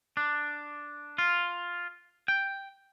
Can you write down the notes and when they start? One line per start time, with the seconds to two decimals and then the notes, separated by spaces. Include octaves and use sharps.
0.17 D4
1.18 F4
2.28 G5